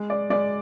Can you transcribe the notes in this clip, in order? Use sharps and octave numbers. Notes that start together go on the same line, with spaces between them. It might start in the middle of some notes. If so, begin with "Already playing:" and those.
Already playing: G#3
D5
G#3 D5